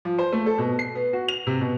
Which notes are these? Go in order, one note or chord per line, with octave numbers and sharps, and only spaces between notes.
F3
C5
A3
A4
B2
C7
B3
F#4
F7
C3
B2